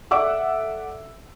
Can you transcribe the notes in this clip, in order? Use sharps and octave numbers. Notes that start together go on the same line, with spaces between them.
A4 D5 E5 F#5 D6 E6